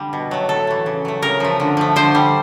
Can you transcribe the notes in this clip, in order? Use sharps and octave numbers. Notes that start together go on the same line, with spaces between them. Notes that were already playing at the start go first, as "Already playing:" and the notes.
Already playing: D3 G3
B2
F#3 A3
A2 A4
E3 A3
C#3
F#3 A3
C#3 A#4
F3 A3
D3
F3 A3
D3 C5
G3